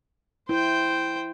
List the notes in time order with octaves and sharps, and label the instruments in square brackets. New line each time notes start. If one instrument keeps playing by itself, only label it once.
[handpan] E4 [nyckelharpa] C5 G5